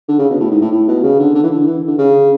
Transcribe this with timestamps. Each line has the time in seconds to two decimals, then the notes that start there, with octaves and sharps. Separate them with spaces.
0.08 D3
0.19 C#3
0.30 B2
0.40 A2
0.51 G#2
0.61 A2
0.72 A2
0.88 B2
1.03 C#3
1.19 D3
1.35 D3
1.43 E3
1.51 D3
1.67 E3
1.88 D3
1.98 C#3